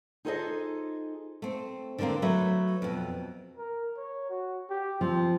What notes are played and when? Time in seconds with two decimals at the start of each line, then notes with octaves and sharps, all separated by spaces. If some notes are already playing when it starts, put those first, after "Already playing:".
0.25 D#4 F4 G#4 A4 C5 D#5
1.42 A3 C4
1.99 D3 E3 G#3 A#3 C4
2.22 F#3 A3 B4 E5
2.82 F2 B2
3.57 A#4
3.97 C#5
4.30 F#4
4.70 G4
5.01 F3 C4